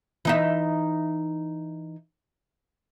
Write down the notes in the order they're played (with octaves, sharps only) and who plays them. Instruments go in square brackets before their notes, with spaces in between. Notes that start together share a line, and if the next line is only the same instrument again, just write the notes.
[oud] E3 D#4 E5